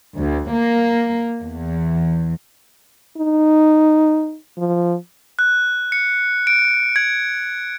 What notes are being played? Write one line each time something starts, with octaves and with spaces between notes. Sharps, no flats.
D2
A#3
E2
D#4
F3
F#6
C#7
D7
G#6